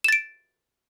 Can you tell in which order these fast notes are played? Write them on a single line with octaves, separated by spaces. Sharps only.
E7 A6 D7